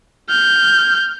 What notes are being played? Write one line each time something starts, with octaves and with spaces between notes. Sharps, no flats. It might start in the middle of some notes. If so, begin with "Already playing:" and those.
F6 G6